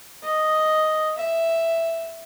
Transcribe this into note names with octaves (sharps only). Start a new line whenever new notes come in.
D#5
E5